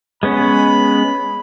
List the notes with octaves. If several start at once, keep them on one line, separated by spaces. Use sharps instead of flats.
G#3 B3 C#4 B5